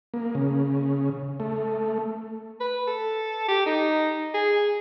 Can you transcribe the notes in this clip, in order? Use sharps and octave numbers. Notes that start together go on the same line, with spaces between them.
A#3
C#3
A3
B4
A4
G4
D#4
G#4